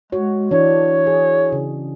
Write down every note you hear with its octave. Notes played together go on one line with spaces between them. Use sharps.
G#3 F#4 C#5
E3 D4 C#5
G#4
C#3